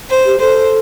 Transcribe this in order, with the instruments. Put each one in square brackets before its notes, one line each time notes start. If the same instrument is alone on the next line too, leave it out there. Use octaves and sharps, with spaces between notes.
[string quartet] C5
[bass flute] G4
[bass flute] A4 [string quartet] C5